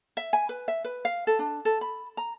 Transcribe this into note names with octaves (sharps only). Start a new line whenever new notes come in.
E5
G#5
B4
E5
B4
F5
A4
D4
A4
B5
A#5